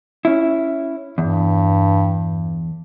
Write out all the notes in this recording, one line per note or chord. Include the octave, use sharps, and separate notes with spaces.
C#4 E4
E2 G2